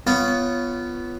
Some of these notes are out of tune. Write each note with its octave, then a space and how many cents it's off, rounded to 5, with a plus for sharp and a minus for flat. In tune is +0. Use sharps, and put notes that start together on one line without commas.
B3 +5 F4 -15 C#5 +5